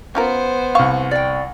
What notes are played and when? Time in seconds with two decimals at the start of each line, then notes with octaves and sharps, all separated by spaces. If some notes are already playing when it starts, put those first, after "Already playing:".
0.15 B3 C#4 F4 A#4 C5
0.75 C2 F5 C#6
1.11 D5 G5